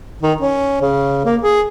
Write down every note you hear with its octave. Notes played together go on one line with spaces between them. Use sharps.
D#3
C#4
C#3
A#3
G#4